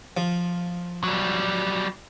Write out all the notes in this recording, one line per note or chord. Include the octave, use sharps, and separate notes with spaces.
F3
F#3 G3